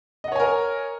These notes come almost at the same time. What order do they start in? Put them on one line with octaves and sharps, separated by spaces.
D#5 F#5 C#5 G#5 A#4